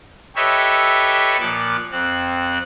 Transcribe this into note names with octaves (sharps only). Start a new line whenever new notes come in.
G4 A4 B4 C#5 D#5 E5
A#2 F3 D6 F#6
F2 C4 F#6